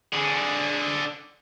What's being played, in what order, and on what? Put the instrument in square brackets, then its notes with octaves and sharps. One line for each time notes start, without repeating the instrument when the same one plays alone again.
[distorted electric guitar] D3 G#4